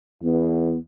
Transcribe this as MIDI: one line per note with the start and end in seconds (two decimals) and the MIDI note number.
0.23 0.76 40
0.23 0.78 59